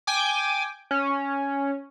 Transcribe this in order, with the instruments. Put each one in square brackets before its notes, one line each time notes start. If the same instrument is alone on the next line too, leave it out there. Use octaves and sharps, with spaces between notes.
[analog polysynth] G5 G#5 D6
C#4